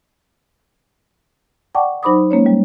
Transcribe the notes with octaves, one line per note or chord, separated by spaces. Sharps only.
D5 F#5 G5 A5 C#6 D6
F#3 D#4 C5 B5 D6 D#6
G#3 A#3 C#4 C#5
G3